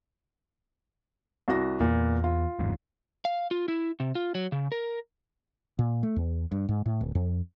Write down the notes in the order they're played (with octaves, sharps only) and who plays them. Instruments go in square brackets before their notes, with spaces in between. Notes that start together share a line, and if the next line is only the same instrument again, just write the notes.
[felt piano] C2 F#4 A#6
[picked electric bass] E2 [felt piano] A#2
[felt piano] F4
[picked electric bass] G1 E2 G#2
[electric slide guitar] F5
F4
E4
C3
F4
F#3
C#3
A#4
[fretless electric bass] A#2
A3
E2
G2
G#2
A2
D1
F2